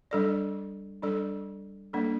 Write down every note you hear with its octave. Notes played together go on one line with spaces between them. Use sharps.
G3 D4 A4 D5
G3 D4 A4 D5
G3 A#3 D4 A4 D5